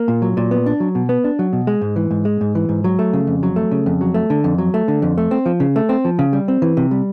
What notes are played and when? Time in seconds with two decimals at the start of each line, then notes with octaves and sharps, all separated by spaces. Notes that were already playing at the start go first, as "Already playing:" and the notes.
Already playing: A#3
0.08 A#2
0.22 F#3
0.37 A#2
0.51 B3
0.66 D4
0.80 F#3
0.95 B2
1.09 B3
1.24 D4
1.39 F#3
1.53 B2
1.67 G#3
1.82 G#2
1.96 E3
2.11 G#2
2.25 G#3
2.41 G#2
2.55 E3
2.69 G#2
2.84 F#3
2.99 A3
3.13 C#3
3.27 F2
3.43 F#3
3.56 A3
3.71 C#3
3.86 F2
4.01 F#3
4.14 A3
4.30 D3
4.44 F2
4.58 F#3
4.74 A3
4.88 D3
5.02 F2
5.18 A3
5.31 C4
5.46 F3
5.60 C#3
5.76 A3
5.89 C4
6.05 F3
6.19 C#3
6.33 G3
6.48 C4
6.62 E3
6.77 C3
6.91 G3